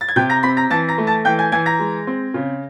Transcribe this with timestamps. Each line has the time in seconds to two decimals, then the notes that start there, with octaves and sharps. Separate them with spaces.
0.01 A6
0.08 G#6
0.16 C3 G5 G6
0.30 A#5 A#6
0.43 C4 B5 B6
0.57 A#5 A#6
0.70 E3 A5 A6
0.89 A#5 A#6
0.98 A3
1.07 A5 A6
1.25 E3 G5 G6
1.39 G#5 G#6
1.52 E3 G#5 G#6
1.66 A#5 A#6
1.79 G#3
2.07 C4
2.34 C#3